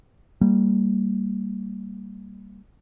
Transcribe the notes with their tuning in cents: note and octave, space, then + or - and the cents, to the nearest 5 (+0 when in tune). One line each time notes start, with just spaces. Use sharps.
G3 +0 A#3 -15